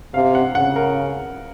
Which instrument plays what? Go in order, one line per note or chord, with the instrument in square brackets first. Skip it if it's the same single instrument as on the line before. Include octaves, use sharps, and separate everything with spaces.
[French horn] C3 [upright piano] F5
[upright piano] F#5
[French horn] C#3 [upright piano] F#5
[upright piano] A#4